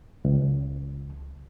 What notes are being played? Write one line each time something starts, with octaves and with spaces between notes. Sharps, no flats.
C#2